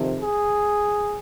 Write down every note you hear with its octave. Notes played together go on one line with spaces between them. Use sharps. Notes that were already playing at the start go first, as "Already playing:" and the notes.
Already playing: F2 C3 D#3
G#4